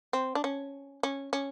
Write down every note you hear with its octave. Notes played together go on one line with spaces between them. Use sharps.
C4
D4
C#4
C#4
C#4